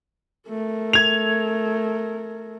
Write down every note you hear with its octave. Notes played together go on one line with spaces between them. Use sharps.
A3 A#4
G#6 F7